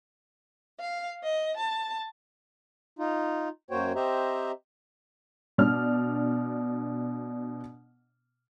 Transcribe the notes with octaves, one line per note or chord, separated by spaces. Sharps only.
F5
D#5
A5
D#4 F4
F#2 A#3 F#4 C5 C#5 G5
C4 G4 C5 D#5 E5 A#5
B2 D4 F6